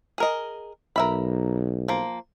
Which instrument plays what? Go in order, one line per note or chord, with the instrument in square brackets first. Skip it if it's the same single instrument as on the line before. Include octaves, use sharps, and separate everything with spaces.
[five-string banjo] G#4 A#4 D#5
[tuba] B1 [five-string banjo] A#4 E5 B5
[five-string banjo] F3 A#3